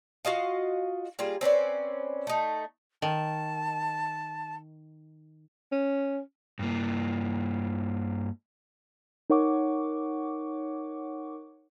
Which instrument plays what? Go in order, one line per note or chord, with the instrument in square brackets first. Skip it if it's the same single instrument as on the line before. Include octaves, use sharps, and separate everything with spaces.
[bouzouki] F4 F#4 D#5 F5
G3 A#3 F4 G#4
C4 C#4 B4 D5
A3 D#4
[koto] D#3 [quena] A5
[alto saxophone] C#4
[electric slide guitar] G2 A#3
[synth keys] D#4 A#4 C#5 F#5 C#6 D6